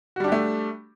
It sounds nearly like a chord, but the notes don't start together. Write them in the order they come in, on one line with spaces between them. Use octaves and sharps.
F#4 G3 D4 G4 A3